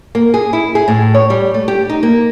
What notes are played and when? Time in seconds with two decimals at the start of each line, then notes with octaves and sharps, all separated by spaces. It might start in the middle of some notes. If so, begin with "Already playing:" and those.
0.15 A#3
0.34 G#4
0.53 E4
0.75 G#4
0.88 A2
1.14 C#5
1.30 G3
1.54 A3
1.68 G4
1.90 D#4
2.03 A#3